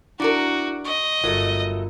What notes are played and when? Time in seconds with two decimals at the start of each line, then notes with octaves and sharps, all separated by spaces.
0.20 D4 E4 F#4 A#4 D7
0.85 D#5 C#6
1.24 G1 F#3 A3 F4 A#4